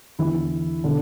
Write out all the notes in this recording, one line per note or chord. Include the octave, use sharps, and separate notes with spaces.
E2 D3 E3 E4
B2 D3 D4